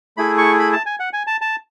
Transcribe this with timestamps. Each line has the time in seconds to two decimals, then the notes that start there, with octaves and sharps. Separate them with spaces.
0.17 A3 E4 G#4 B5
0.38 C#6
0.59 B5
0.73 A5
0.86 G#5
1.00 F#5
1.13 G#5
1.27 A5
1.41 A5